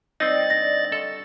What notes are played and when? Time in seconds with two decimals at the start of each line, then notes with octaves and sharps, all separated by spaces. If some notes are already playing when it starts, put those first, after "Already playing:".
0.20 G3 C4 D#4 D#5 G5 F#6 A6
0.50 D3 B5 A#6
0.92 A4 F5 C6 C#6